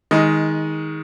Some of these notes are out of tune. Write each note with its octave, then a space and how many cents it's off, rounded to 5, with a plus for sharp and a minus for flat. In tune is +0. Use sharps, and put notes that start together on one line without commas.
D#3 +20 G#3 +0 D#5 +15